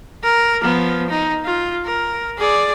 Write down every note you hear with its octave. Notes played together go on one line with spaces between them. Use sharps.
A#4
F3 B3
D#4
F4
A#4
G#4 D5